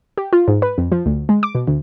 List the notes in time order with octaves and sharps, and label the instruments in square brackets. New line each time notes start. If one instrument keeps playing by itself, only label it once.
[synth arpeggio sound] G4
F4
G#2
B4
F2
F3
D2
G#3
D6
B2
D2